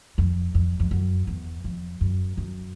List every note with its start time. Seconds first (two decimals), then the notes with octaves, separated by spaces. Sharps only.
0.18 F2
0.55 F2
0.80 F2
0.91 F#2
1.27 E2
1.64 F2
2.01 F#2
2.37 F#2